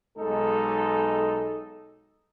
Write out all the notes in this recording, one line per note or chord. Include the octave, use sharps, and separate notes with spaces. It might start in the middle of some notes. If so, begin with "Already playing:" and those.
B1 G#3 D#4 A4